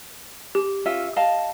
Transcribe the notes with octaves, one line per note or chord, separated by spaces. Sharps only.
G4
C#4 F4 E5
D#5 F5 A5